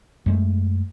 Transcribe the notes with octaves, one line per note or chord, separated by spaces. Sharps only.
F#2 G#3 A3